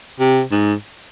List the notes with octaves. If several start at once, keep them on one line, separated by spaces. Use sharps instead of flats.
C3
G#2